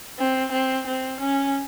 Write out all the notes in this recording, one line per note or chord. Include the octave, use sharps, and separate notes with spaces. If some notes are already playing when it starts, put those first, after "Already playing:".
C4
C4
C4
C#4